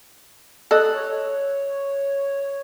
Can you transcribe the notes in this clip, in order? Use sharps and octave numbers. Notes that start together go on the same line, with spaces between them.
A4 D#5 F#6
C#5